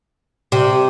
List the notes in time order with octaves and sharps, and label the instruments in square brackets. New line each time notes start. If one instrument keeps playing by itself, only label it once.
[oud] C3